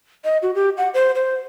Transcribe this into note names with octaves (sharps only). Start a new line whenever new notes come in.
D#5
F#4
G4
F#5
C5
C5